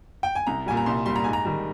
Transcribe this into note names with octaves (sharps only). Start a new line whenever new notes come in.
G5
G#5
C2 A#5
A#2 G3 G#5
A#5
C2 C6
A#2 G3 C6
A#5
G#2 G#5
A#5
D#3 G3